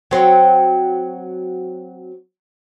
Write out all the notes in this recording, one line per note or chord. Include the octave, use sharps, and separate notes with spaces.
F#3 C4